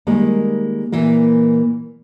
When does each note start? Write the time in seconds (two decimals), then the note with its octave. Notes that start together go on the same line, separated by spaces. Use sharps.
0.07 D#3 G3 G#3 A#3
0.92 A#2 E3 A#3